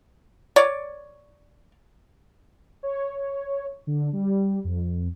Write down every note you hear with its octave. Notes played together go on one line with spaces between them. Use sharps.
C#5 D5
C#5
D3
G3
F2